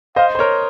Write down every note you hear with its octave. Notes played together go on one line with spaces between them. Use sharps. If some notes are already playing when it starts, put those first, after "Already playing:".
C5 D#5 F5
C5
A#4 C#5